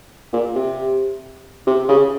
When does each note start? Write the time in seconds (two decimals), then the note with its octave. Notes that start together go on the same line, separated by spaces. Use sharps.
0.33 A#2
0.55 C3
1.67 C3
1.89 C#3